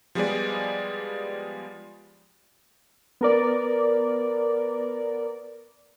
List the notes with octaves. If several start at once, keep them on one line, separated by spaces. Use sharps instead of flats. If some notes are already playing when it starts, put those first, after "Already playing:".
F3 G3 G#3 B3 G#4 D5
B3 A#4 D5